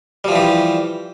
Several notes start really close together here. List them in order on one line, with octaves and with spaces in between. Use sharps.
G3 F3 E3 G4